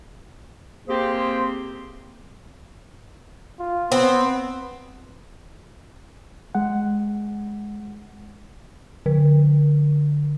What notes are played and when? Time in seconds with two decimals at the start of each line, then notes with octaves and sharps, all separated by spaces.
0.87 A#3 C4 G4 G#4 C5
3.59 F4
3.92 B3 C4
6.55 G#3 F#5
9.06 D3